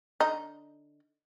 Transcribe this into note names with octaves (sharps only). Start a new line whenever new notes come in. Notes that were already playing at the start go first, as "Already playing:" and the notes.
D3 D#4